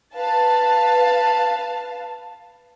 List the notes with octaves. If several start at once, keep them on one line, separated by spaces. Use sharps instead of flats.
B4 F5 A5